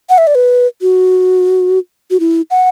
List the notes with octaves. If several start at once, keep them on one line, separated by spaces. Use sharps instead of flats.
F#5
E5
D5
B4
F#4
F#4
E4
F#5